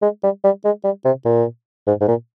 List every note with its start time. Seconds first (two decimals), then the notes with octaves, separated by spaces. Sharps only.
0.02 G#3
0.23 G3
0.44 G3
0.65 G#3
0.84 G3
1.05 C3
1.25 A#2
1.87 G#2
2.01 G#2
2.08 A#2